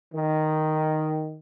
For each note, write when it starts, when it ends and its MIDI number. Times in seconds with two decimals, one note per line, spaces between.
0.13 1.36 51